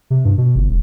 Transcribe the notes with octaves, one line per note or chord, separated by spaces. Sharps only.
C3
G2
B2
G1
D#1